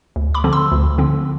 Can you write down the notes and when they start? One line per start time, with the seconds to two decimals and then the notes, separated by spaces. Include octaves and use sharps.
0.16 D2
0.34 B5 D6
0.44 D3 F3 C4
0.53 C6 E6
0.72 D2
0.98 D3 F3 C4